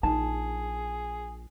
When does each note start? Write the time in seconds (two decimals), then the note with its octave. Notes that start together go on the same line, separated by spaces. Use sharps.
0.03 A#1 D#4 G#4 A5